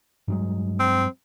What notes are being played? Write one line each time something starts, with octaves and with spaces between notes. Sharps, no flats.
G2 F#3 G#3
C4